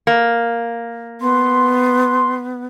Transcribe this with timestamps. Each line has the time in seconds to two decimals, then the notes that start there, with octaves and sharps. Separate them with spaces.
0.07 A#3
1.21 B3 C6